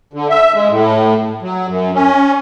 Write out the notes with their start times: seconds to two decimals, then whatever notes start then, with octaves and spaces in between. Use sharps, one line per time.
0.13 D3
0.30 E5
0.54 G#3
0.69 A2
1.42 F#3
1.67 F#2
1.95 C#4